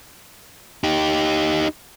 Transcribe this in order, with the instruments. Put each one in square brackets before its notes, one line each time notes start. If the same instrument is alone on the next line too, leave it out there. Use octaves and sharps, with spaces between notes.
[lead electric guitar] D#4 G4